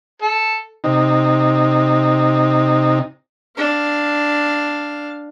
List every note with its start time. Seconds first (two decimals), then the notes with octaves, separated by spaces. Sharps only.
0.22 A4
0.84 C3 D#4
3.57 D4 F5